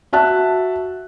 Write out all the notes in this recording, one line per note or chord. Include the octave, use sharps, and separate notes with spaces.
F#4 E5 A5 F#6